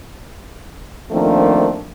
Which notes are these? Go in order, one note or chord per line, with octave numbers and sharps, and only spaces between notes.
D#3 F3 A3 A#3 C4 D4